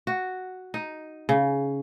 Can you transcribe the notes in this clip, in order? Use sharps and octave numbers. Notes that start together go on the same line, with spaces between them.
F#4
D#4
C#3